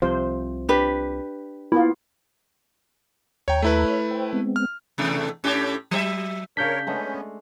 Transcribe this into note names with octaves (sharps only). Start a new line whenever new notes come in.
C2 C3 F3 C5
D4 G4 B4
A#3 B3 E4 F4
D#2 C#5 G5 A#5
A3 E4 B4
C#5 F6
C5 G5
G#3 B3 C4
F6
E2 C3 A3
A2 C#4 G4
F#3 C5 E5
C#3 D4 A#4 C#5 G6 B6
G#3 A3 B3 C#4 D4